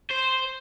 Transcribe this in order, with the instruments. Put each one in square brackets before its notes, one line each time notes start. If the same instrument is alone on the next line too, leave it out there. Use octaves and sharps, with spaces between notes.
[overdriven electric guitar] C5